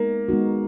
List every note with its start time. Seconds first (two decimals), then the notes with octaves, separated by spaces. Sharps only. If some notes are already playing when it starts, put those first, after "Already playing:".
Already playing: G#3 A#3 B3 D#4
0.29 G#3 B3 D#4 F#4